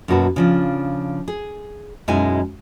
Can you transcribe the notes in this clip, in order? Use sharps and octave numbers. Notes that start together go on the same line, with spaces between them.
F#2 B2 A#3 F#4 B4 A5
C#3 F3 D4
G#4
F#2 B2 G#3 D#4 E4 G#5